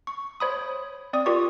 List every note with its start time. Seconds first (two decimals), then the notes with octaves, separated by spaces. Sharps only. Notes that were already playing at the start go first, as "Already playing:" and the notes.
0.07 C#6
0.40 C5 C#5 B5 D#6
1.13 C4 D5 D#6
1.26 F4 G4 A#4 D5 C#6